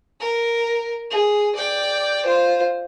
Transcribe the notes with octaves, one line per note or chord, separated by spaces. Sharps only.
A#4
G#4
D5 G5
F4 C5